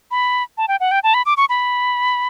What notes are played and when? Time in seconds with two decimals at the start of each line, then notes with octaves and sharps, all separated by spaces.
0.11 B5
0.58 A5
0.68 G5
0.80 F#5
0.91 G5
1.04 A5
1.14 B5
1.26 D6
1.37 C#6
1.49 B5